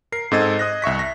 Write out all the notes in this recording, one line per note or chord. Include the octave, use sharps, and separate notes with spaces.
A#4 C7
G#2 C4 A4 D#5 G#6 A6
D#5 D#6 F#6 A#6
C2 E5 C#6 B6
A#6